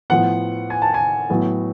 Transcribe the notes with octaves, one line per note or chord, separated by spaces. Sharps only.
A2 F3 B3 F#5
G#5
A5
G#5
A2 F#3 B3